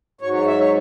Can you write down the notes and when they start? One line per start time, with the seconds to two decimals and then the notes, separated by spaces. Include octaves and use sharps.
0.21 G#2 F#3 C#5
0.33 C#5
0.46 E5
0.58 C#5